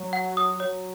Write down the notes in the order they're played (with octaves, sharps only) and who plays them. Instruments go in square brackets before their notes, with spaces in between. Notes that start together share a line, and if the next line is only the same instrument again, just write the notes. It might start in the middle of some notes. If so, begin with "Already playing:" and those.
Already playing: [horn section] F#3
[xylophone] F#5
D#6
[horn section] F#3 [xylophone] C#5